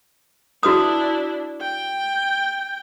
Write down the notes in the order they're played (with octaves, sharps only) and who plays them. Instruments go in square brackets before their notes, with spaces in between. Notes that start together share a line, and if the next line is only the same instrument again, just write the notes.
[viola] D4 E4 [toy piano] F#4 B4 D#6
[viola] G5